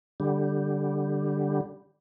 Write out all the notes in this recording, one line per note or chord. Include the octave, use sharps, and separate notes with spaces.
D3 G3